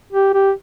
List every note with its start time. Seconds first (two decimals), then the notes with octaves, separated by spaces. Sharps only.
0.12 G4
0.34 G4